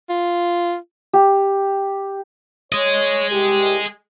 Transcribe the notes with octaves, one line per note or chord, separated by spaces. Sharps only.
F4
G4
G#4 C#5 D#5
C2 G4